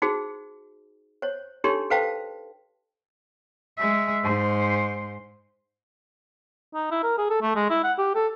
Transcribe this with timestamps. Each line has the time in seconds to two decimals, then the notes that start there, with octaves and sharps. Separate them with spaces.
0.02 D#4 F#4 G#4 C5
1.22 C5 C#5
1.64 D4 D#4 G4 A4 C#5 C6
1.90 A4 B4 C5 F5 G5 A5
3.78 G#3 E5
4.24 G#2 C5
6.74 D#4
6.91 E4
7.03 A#4
7.18 G#4
7.30 A4
7.42 A3
7.56 G#3
7.70 E4
7.84 F#5
7.98 G4
8.15 A4